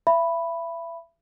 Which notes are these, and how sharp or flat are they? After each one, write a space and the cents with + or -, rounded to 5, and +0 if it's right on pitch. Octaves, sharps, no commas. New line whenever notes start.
E5 +30 B5 +0